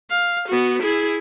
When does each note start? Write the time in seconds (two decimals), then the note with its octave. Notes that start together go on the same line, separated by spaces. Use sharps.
0.10 F5
0.49 B3 F#4
0.82 E4 G#4